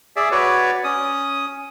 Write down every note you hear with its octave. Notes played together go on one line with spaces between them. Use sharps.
G#4 D5 E5
F#4 B4 C#5 D5
C#4 D#6